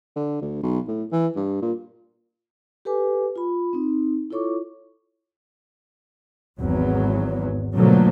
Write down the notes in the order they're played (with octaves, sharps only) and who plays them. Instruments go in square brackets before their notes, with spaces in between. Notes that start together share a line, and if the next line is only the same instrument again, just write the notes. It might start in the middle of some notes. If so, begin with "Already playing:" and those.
[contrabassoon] D3
D2
B1
A2
E3
G2
A#2
[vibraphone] G4 A4 B4 G#5 D6
F4 B5
C4 D#4
E4 F4 A4 C#5 C#6 D6
[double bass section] G#1 E2 G#2 F#3
B2 D3 F3 F#3 A3 A#3